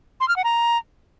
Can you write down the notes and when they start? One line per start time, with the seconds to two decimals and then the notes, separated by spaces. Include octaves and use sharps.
0.20 C6
0.28 F6
0.36 F#5
0.44 A#5